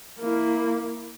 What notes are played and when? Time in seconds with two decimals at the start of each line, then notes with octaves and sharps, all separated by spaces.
0.20 A#3 E4